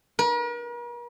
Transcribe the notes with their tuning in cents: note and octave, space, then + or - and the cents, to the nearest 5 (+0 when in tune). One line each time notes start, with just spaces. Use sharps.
A#4 +45